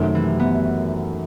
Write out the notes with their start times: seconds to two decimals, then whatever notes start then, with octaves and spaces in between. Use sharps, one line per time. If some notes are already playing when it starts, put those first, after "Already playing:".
Already playing: F#2 C3 D#3 A3
0.15 E3
0.40 B3